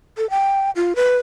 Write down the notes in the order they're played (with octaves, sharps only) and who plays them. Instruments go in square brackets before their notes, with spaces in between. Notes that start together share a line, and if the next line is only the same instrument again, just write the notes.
[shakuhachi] A4
G5
F4
B4